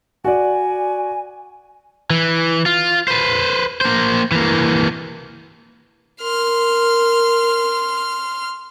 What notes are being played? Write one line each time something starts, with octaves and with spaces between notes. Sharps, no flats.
F#4 D5 G#5
E3
F4
B4 C5
A#3 C5
E3 A#3
A#4 C6 F6